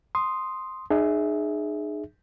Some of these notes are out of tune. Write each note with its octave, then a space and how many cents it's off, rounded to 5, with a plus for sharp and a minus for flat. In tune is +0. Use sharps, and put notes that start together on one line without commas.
C6 +0 D#6 +0
D#4 -40 G#4 +5 E5 -10